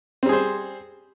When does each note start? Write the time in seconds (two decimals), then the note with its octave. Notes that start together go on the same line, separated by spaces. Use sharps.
0.23 C4
0.26 G3
0.29 G#4
0.32 C5